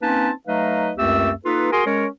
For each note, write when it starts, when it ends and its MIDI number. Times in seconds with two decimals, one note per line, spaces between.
0.02 0.31 58
0.02 0.31 60
0.02 0.31 61
0.02 0.31 63
0.02 0.31 71
0.02 0.31 81
0.47 0.92 54
0.47 0.92 57
0.47 0.92 63
0.47 0.92 71
0.47 0.92 75
0.47 0.92 77
0.98 1.32 37
0.98 1.32 42
0.98 1.32 57
0.98 1.32 60
0.98 1.32 67
0.98 1.32 88
1.45 1.69 58
1.45 1.69 63
1.45 1.69 65
1.45 1.69 69
1.45 1.69 71
1.72 1.83 66
1.72 1.83 68
1.72 1.83 70
1.72 1.83 80
1.72 1.83 84
1.87 2.07 56
1.87 2.07 61
1.87 2.07 70
1.87 2.07 73